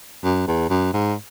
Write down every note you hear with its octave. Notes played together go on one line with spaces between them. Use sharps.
F#2
E2
F#2
G#2